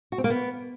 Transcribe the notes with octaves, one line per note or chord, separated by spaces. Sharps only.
F#4
C4
A#3
B3